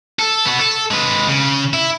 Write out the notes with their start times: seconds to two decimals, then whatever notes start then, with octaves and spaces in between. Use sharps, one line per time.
0.19 A4
0.46 B3 F#4
0.60 A4
0.91 G#3 B4
1.28 C#3
1.74 E4